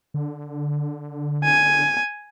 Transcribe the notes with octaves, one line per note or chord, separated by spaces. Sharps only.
D3
G#5